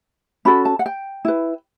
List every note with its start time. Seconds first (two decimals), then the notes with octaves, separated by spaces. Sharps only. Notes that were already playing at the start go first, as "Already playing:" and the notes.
0.45 C#4 F#4 A4 B5
0.65 A5
0.79 F#5
0.86 G5
1.25 E4 B4